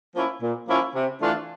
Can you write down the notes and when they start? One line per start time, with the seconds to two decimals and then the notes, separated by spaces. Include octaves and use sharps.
0.15 F3 A#3 C#4 E4
0.42 A#2
0.68 F3 A#3 C#4 E4
0.95 C3
1.22 E3 A3 D4 F4